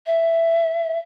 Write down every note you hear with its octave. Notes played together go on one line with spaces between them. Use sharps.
E5